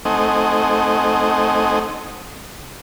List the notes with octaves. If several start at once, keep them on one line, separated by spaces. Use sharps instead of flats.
A3 C4 D#4 D#5 F#5 G#5